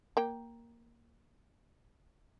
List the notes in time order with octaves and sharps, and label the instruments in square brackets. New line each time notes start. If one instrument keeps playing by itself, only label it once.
[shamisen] A#3 G5